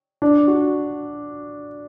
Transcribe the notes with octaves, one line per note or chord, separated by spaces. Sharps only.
D4
F#4